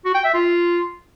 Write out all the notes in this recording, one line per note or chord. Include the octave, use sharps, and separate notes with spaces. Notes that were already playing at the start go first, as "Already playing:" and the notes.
F#4
G5
E5
F4